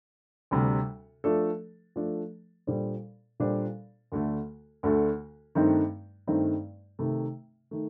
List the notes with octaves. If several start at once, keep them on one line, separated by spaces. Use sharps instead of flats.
D2 C3 G3
F3 A3 D4 A4
F3 A3 D4 A4
A#2 G3 D4 A4 C5
A#2 G3 D4 A4 C5
D2 D3 A3
D2 D3 A3
G2 D#3 A3 C4 D#4
G2 D#3 A3 C4 D#4
C3 D#3 A3
D#3 A3